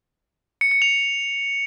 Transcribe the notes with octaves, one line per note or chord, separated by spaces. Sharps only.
C#7
C#7
F7